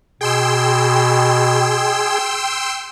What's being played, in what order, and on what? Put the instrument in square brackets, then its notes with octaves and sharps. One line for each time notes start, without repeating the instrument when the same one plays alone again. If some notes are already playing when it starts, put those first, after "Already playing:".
[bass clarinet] B2 [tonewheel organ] G#4 [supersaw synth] G5 C6 E6